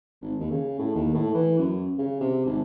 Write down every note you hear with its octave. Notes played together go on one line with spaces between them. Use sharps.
G#1
D#2
C#3
A2
D#2
A2
E3
F#2
C#3
C3
G#1